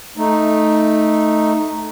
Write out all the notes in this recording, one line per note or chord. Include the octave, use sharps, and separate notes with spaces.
A3 D#4